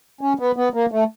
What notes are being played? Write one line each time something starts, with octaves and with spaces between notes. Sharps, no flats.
C#4
B3
B3
A#3
A3